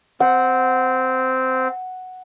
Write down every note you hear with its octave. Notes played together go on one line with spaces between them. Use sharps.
C4 F#5